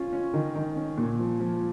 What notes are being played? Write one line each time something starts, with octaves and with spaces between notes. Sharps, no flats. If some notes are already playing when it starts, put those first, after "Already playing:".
Already playing: C#4 F4
C#4
D#3
D#3
C#4
A#2
F3
F3